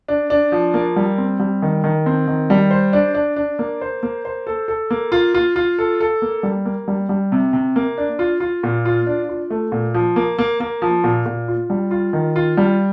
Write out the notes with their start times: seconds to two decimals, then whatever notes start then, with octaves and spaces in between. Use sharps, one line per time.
0.08 D4
0.30 D4
0.52 F3
0.74 A#3
0.96 G3
1.18 C4
1.40 G3
1.62 D#3
1.84 D#3
2.06 C4
2.28 D#3
2.50 G3
2.71 C5
2.93 D4
3.14 D4
3.36 D4
3.59 A#3
3.81 C5
4.03 A#3
4.25 C5
4.47 A4
4.68 A4
4.90 A#3
5.12 F4
5.34 F4
5.56 F4
5.79 A4
6.01 A4
6.22 A#3
6.43 G3
6.65 A#3
6.88 G3
7.09 G3
7.32 C3
7.53 C3
7.76 A#3
7.98 D4
8.19 F4
8.40 F4
8.63 A#2
8.85 F4
9.07 D4
9.29 F4
9.50 A3
9.72 A#2
9.94 F3
10.16 A#3
10.38 A#3
10.60 A#3
10.82 F3
11.04 A#2
11.26 A#2
11.48 F4
11.70 G3
11.91 F4
12.13 D#3
12.36 F4
12.57 G3